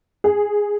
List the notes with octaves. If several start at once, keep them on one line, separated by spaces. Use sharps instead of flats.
G#4